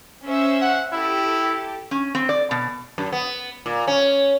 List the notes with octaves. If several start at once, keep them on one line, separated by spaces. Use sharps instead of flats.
C#4 C5 E5
F#5
E4 G4 A4
C#4
C4
D5
B2
F#2
B3
A#2
C#4